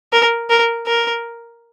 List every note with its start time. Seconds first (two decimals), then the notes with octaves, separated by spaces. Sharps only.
0.13 A#4
0.50 A#4
0.87 A#4